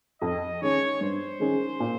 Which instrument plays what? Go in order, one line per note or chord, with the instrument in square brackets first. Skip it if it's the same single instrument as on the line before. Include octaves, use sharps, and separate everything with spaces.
[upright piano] F2 [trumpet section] D#5
[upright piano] D#3 G#3 C#4 [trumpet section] C#5
[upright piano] G2 [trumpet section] C5
[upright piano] D#3 G#3 C#4 G#4
A#2